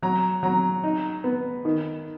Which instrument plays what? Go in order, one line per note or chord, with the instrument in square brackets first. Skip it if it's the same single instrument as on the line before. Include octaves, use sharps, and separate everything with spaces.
[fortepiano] F#3 [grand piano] A#5
[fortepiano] F#3 [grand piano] A#5
[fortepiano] D#4
B3
D#3